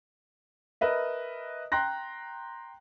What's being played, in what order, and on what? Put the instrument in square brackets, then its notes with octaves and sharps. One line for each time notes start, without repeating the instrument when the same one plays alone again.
[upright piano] A#4 B4 D#5 E5
G5 A#5 C6 F#6 A#6